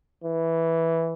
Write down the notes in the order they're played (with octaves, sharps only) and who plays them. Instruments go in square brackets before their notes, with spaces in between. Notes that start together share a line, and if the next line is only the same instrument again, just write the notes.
[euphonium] E3